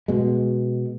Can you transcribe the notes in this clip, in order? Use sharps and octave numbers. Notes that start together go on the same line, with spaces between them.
B2 G#3